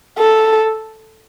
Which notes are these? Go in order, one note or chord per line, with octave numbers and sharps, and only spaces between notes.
A4